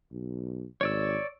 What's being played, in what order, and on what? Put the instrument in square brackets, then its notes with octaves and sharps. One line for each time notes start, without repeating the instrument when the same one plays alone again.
[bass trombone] B1
[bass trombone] G#1 [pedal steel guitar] C#5 D5 E6